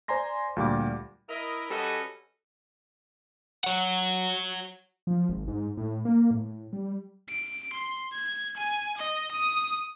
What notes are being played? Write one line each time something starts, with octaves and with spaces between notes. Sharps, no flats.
C5 D5 G#5 A#5 C6 A#6
D2 A#2 G3 F5 G5 D6
E4 A#4 D#5
G3 C#4 F#4 A4 B4 D#5
C#5 F#5
F3
G#1
G#2
A2
A#3
A2
G3
D7
C6
G#6
G#5
D#5
D#6